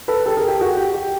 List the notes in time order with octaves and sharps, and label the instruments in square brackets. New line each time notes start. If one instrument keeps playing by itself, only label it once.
[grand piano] A4 B4
G4 A4
G#4 A#4
G4
F#4 G#4
G4
G4